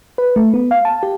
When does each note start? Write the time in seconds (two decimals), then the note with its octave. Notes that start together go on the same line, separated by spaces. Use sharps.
0.18 B4
0.36 A3
0.54 B3
0.71 F5
0.85 A5
1.03 G4